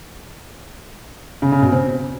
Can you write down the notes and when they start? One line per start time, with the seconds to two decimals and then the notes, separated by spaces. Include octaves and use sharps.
1.42 C#3
1.52 C#3
1.62 B2
1.72 C4